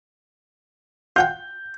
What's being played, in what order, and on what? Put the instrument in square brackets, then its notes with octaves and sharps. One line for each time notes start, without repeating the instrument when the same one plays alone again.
[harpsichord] F4 F#5 G5 [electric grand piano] G6